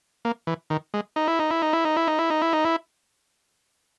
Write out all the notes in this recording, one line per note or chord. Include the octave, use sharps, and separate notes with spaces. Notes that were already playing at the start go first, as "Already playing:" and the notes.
A#3
E3
D#3
G#3
D#4
E4
D#4
E4
D#4
E4
D#4
E4
D#4
E4
D#4
E4
D#4
E4